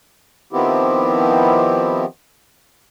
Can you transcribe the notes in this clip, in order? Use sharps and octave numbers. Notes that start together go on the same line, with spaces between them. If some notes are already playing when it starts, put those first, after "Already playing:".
D#3 F3 B3 C4 E4 G4